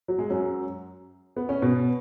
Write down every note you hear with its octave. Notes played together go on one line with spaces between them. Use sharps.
F#3
G#3
F#2 F#3
B3
C#4
B2 B3